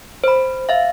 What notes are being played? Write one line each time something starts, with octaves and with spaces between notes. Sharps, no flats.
C5 B5
E5 F5